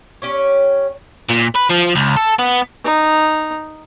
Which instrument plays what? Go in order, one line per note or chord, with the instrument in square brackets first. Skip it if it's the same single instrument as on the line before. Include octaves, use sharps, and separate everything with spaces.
[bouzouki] C#4 G4 C#5
[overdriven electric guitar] A#2
B4
F3
C#2
A4
B3
[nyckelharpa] D#4